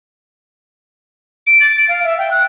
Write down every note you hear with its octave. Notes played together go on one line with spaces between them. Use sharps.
D7
A6
D7
F5
E5
G5
F#6